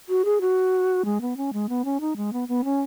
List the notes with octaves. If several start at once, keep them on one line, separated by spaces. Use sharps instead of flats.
F#4
G#4
F#4
G#3
B3
C#4
G#3
B3
C#4
D#4
G#3
B3
B3
C#4